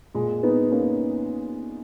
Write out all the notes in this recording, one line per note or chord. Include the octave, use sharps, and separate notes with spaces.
A#2 G#3
B3 D#4
A#3 C#4